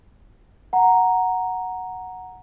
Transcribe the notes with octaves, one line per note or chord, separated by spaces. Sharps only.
F#5 A#5